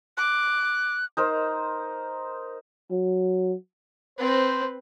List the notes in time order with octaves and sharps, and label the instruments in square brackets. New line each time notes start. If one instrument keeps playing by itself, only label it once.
[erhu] D6 [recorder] F#6
[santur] D#4 A#4 C5
[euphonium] F#3
[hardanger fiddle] C4 B4 [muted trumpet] C5